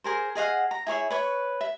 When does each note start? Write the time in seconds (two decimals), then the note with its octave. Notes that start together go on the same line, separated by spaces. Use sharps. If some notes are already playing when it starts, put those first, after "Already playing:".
0.04 G#4 A#4 C5
0.35 G#4 D#5 F5 F#5
0.71 A#5
0.87 E4 G#4 C#5 E5
1.10 B4 C#5 C#6
1.61 E5